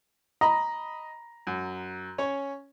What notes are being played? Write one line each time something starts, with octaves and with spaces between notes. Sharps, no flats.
D#5 A#5 B5
F#2
C#4 C#5